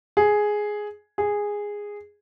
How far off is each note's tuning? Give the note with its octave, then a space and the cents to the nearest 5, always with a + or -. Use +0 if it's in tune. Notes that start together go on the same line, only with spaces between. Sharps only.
G#4 +5
G#4 -10